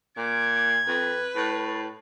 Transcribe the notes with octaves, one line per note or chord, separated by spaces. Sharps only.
A#2 D6 G#6
F2 B4
A2